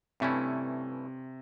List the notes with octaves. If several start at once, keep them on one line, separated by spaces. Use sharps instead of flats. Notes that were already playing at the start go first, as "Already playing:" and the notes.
G2 C3 E3 A3 C#4 E4